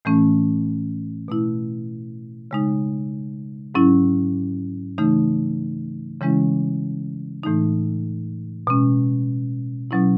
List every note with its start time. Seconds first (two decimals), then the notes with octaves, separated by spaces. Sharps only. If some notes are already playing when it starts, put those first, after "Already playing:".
0.05 A2 E3 A3 C#4
1.28 B2 A3 E4
2.51 C#3 G#3 D#4
3.75 G#2 F#3 C#4 E4
4.98 C#3 E3 A3 D#4
6.21 C#3 E3 G#3 C#4 E4
7.43 A2 E3 A3 D#4
8.67 B2 G#3 C#4
9.91 B2 F#3 C#4 E4